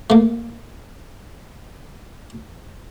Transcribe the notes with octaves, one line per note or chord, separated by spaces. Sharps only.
A3 A#3